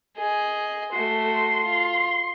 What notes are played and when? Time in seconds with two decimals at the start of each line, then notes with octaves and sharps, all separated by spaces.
0.16 G#4 D#5
0.92 A3 F#4 C6
1.65 F4